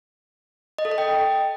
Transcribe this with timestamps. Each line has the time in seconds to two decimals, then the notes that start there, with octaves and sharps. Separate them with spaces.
0.78 D#5
0.85 A4
0.91 D#5
0.98 G5